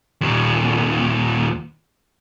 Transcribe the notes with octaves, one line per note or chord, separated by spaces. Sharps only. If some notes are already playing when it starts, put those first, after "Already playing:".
D#2 A#2